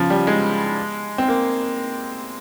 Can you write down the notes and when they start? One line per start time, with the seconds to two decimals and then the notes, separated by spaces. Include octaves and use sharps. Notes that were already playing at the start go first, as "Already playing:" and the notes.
Already playing: C#3 F3
0.10 G3
0.27 G#3
1.18 C4
1.28 A#3